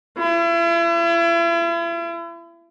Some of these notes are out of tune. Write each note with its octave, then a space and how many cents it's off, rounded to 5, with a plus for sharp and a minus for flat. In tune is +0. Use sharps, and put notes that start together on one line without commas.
E4 +40